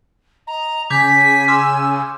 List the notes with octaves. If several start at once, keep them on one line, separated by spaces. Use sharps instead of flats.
D#5 A#5
C#3 G#5 D6 G6 G#6 B6
C6 D6 E6 F6